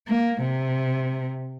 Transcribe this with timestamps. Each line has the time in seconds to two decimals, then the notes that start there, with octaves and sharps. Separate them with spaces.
0.08 A#3
0.40 C3